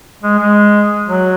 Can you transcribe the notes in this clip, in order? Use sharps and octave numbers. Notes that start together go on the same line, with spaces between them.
G#3
G#3
F#3